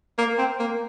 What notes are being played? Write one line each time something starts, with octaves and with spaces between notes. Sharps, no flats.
A#3
C4
A#3